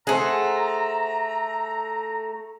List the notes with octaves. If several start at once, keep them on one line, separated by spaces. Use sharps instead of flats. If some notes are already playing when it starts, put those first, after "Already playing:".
A3 G#4 C5 F#5 A#5